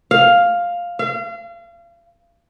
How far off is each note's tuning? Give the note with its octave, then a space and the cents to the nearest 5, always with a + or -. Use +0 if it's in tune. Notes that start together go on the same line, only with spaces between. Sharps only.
F5 +5
F5 -35